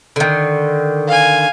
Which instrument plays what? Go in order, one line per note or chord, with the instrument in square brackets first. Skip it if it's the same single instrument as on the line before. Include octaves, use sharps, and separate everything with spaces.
[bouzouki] D3 D#3
[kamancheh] F5 G#5